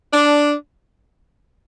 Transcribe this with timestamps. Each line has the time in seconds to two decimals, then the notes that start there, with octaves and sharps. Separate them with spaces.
0.14 D4